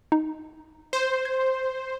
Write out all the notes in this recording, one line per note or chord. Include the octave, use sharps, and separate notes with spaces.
D#4
C5
G#6